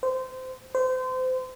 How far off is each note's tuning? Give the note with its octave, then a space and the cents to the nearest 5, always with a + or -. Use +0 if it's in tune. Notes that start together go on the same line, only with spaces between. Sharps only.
C5 -20
C5 -30